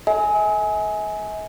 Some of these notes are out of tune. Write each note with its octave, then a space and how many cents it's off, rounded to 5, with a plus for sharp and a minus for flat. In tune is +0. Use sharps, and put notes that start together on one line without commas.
A4 +0 E5 -45 G#5 +10